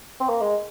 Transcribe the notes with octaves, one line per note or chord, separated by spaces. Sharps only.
C4
A#3
G#3